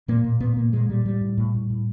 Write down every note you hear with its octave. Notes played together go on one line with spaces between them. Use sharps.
A#2 A#3
A#2
A#2 B3
A#2 A#3
A#2 G#3
A#2 G3
A2 G3
A2
A2
A2
A2